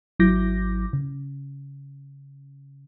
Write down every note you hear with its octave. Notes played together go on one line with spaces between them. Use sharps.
G#1 F#3 E4 D6 G6 A#6
C#3